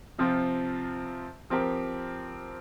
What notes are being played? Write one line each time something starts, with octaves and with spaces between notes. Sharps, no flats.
C3 F3 C4 F4
F3 C4 G4 A#4